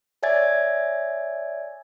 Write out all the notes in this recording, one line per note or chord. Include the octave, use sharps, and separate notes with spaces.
C#5 D5 E5 G#5 G#6 A6